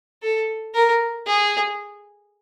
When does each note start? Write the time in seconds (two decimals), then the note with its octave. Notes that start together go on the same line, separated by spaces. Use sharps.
0.23 A4
0.75 A#4
1.27 G#4